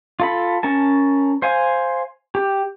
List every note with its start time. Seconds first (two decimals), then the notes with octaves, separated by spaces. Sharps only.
0.20 F4 A4 B5
0.63 C#4 A#4 A5
1.42 C5 F5 G#5
2.35 G4